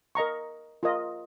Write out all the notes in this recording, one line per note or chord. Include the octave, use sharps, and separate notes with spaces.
A#4 D#5 A#5 C#6
F4 A#4 D#5